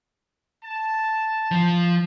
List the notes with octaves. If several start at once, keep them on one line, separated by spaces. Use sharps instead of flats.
A5
F3